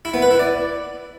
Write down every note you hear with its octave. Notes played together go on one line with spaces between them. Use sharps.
E4
B3
B4
E4
D5